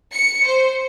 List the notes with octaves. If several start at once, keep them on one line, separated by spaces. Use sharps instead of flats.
C#7
C5